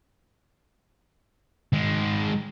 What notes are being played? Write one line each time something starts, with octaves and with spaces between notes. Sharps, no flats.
D#3 G#3